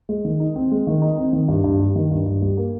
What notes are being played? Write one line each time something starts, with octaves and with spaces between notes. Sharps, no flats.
G#3
D#3
D#4
C4
G#3
D#3
D#4
C4
D#3
G2
G2
G3
D#3
G2
G2
G3
A#3